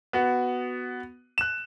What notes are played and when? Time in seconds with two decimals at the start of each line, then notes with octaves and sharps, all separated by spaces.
0.13 B3 F#4
1.38 F#6 E7